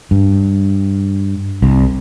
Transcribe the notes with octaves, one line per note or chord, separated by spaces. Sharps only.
G2
C2